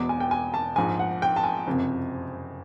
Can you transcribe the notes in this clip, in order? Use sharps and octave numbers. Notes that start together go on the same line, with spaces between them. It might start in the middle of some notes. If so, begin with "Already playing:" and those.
Already playing: E1 E2 B2 D6
G#5
G5
G#5
A5
A#1 G#2 F3 G#5
F#5
G5
A5
G#5
F#1 F2 C3